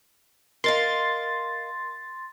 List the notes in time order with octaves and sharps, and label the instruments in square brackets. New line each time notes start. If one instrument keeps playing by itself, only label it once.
[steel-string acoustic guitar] A#4 D#5 F5 [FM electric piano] C6 A6